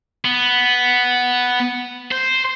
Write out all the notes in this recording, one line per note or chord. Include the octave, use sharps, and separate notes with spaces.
B3
C5